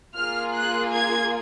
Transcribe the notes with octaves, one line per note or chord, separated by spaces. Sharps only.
A#3 F4 G#4 F6
F#6
G#6